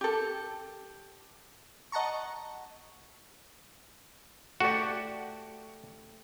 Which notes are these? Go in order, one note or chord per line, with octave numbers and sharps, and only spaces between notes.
G4 A4
D#5 F#5 A5 A#5 C#6
A3 F#4 G4 D5